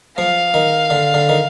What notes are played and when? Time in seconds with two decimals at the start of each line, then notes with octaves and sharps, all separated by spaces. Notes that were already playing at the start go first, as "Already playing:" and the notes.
0.18 F3 F5
0.54 D#3
0.90 D3
1.14 D3
1.29 D#3